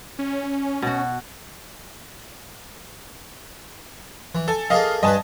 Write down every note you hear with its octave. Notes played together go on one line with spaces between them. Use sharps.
C#4
B2 F#4
E3
A4 G#5
A#3 G#4 A4 D#5 F5
G2 B4 D#5 G#5 A5